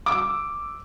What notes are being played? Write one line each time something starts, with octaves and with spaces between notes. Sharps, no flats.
D6 E6